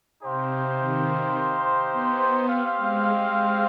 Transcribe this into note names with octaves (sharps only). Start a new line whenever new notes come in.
C3 D#4 G4 C5 F5
D#3
B3
B3 C4 G4 C5 F5
G#3